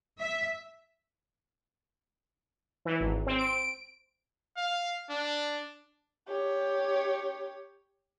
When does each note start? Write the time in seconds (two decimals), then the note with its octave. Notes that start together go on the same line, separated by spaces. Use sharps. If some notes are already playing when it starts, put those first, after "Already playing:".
0.20 E5
2.85 E3
3.00 G#1
3.26 C4
3.38 D7
4.57 F5
5.10 D4
6.28 G4 C#5